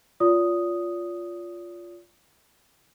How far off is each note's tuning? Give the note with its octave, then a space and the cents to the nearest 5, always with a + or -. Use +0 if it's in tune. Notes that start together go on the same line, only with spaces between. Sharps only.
F4 +0 D5 -40 D#6 +0